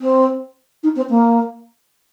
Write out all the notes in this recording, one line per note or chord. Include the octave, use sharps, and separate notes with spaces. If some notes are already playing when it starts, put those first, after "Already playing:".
C4
D#4
C4
A#3